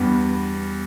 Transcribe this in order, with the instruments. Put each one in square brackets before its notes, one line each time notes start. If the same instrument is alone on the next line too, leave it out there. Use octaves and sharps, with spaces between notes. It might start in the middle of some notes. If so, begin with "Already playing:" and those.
Already playing: [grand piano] E2 G2 [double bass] B3